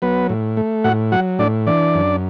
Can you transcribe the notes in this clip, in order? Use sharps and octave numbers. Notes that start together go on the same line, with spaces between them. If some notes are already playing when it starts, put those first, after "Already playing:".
F#3 B3 B4
A2
A3
A2 F#4 F#5
F#3 F#4 F#5
A2 D4 D5
E3 D4 D5
F#2